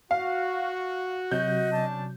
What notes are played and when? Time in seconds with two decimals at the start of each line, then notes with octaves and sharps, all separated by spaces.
0.11 F#4 F5
1.31 C3 F#3 D#5 G6
1.72 C#4 D4 A5